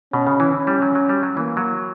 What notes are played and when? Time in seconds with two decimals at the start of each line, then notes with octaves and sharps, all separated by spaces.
0.13 B2 C#4
0.27 C#3
0.40 E3
0.54 C#4
0.67 G3
0.82 F#3
0.95 F#3
1.09 G3
1.23 F#3
1.36 E3 A#3
1.57 F#3